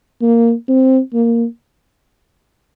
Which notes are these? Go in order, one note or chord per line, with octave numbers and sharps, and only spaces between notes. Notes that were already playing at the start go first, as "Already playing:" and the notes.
A#3
C4
A#3